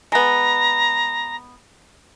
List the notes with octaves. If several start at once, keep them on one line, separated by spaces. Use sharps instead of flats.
G#3 B3 A#5